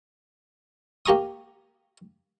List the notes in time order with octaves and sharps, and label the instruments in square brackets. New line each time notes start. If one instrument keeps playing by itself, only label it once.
[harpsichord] A#3 G4 A#5 C#6 D#6